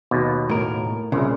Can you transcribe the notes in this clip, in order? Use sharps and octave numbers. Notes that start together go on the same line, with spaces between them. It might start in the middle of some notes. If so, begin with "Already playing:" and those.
D#2 B2
A2 A#4
C2 A#2 C#3